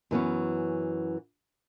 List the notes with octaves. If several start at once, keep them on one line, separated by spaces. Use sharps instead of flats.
F#2 E3 B3 C#4